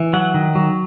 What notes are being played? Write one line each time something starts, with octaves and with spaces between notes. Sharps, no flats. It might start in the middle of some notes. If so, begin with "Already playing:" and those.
Already playing: E3
F#3 F#5
D#3
F#3